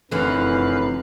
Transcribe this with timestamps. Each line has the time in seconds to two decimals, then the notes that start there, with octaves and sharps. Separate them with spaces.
0.11 F1 F#2 D3 E3 B4 F5 F#6